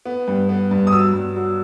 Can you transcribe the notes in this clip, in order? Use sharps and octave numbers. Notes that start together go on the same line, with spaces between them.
B3
G2
B3
G2
D#6
F#3 E6
G2
F#3